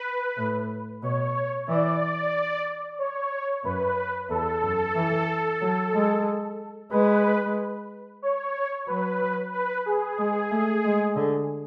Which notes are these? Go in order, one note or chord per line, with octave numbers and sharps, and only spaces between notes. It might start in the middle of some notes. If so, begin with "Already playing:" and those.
Already playing: B4
A2
B2 C#5
E3 D5
C#5
F#2 B4
E2 A4
F#2
E3
F#3
G#3
G#3 B4
C#5
F#3 B4
B4
G#4
G#3
A3
G#3
D3